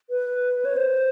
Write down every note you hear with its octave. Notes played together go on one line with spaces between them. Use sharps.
B4
C#5
C5